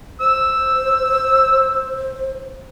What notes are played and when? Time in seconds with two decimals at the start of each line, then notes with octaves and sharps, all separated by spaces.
0.20 C5 E6